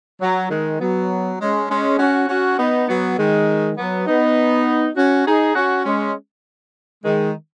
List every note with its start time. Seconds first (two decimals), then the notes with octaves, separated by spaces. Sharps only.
0.21 F#3
0.50 D#3 G#3
0.80 F#3 B3
1.40 G#3 C#4
1.70 G#3 C#4
1.99 C#4 F#4
2.28 C#4 F#4
2.59 B3 D#4
2.88 F#3 B3
3.18 D#3 G#3
3.78 F#3 B3
4.07 B3 D#4
4.96 C#4 F#4
5.26 D#4 G#4
5.55 C#4 F#4
5.85 G#3 C#4
7.05 D#3 G#3